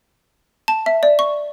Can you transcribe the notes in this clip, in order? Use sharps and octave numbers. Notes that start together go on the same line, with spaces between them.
A5
E5
D5
C#6